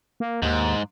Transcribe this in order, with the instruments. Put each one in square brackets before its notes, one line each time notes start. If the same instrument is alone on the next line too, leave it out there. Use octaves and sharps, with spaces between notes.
[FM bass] A#3
[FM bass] D#2 [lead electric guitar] G#2